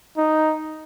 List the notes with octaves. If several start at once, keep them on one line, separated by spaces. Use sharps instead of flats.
D#4